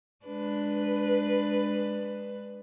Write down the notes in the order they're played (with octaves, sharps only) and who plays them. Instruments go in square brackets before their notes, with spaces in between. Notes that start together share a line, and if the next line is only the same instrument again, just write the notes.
[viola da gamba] G#3 D4 B4